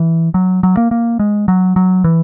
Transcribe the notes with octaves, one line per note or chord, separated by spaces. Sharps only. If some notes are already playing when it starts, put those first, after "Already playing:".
Already playing: E3
F#3
F#3
A#3
A#3
G#3
F#3
F#3
E3